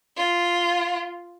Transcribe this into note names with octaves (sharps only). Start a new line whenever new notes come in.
F4